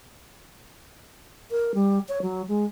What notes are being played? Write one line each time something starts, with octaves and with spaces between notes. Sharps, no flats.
A#4
G3
C#5
F#3
G#3